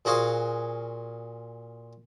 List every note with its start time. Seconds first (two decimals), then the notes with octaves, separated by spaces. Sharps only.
0.05 A#2 F#4 G#4 C5 F5